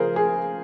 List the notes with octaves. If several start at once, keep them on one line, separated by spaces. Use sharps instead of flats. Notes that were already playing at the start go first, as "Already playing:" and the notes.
Already playing: C#3 F3 G#4 A#4 C5
G#4